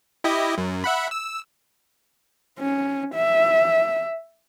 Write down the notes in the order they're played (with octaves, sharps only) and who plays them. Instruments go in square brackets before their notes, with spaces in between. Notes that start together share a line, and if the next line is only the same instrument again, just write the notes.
[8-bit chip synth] E4 G4 D#5
F#2
E5 F#5 B5
E6
[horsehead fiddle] C#4
E5